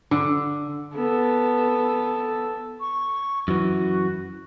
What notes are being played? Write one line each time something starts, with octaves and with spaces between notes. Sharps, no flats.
D3
B3 A4
C#6
F#2 E3 F#4